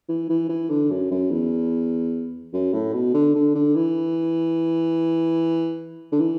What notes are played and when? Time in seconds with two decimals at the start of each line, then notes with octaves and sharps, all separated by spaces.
0.09 E3
0.29 E3
0.49 E3
0.69 D3
0.90 F#2
1.11 F#2
1.31 E2
2.53 F#2
2.73 A2
2.93 B2
3.14 D3
3.35 D3
3.55 D3
3.75 E3
6.12 D3
6.20 E3